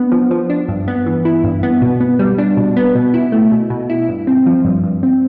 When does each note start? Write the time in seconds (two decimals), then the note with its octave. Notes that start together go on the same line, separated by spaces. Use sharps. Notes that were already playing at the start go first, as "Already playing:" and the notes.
Already playing: B3 D4
0.12 F3
0.31 F3
0.50 D4
0.69 G2
0.88 B3
1.06 E3
1.25 E4
1.44 G2
1.63 B3
1.82 B2
2.00 B3
2.19 G3
2.38 D4
2.57 B2
2.77 B3
2.95 B2
3.14 E4
3.32 A3
3.52 B2
3.70 B2
3.90 E4
4.09 G2
4.27 C4
4.46 F3
4.65 G2
4.84 G2
5.03 C4